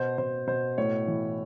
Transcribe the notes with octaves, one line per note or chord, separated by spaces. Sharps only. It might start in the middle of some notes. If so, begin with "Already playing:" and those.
Already playing: B2 C5
B2 C5
B2 C5
A2 C#5
E3